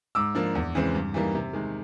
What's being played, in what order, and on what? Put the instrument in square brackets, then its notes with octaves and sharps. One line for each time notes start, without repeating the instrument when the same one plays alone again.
[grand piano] G#2 D6 E6
F3 A#3 D4
E2
C#3 E3 G#3 C4
G2
E3 G3 A#3 D#4
C3
D#3 G#3